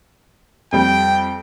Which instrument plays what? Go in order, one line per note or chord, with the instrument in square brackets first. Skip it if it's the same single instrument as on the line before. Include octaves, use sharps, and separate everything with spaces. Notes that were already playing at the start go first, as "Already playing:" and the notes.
[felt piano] F2 G3 [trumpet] G5